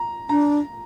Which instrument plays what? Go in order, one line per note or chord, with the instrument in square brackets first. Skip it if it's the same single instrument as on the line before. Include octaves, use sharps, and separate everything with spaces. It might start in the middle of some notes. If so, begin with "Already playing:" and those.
Already playing: [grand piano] A#5
[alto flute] D4 [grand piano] A#5